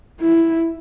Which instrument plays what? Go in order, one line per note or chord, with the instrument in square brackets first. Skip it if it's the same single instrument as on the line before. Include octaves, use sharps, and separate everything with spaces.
[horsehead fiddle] E4